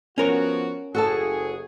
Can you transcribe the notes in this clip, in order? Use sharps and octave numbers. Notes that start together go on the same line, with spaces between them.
F3 B3 C#4 F#4 A#4 C#5
F#1 F#4 G#4 A4 A5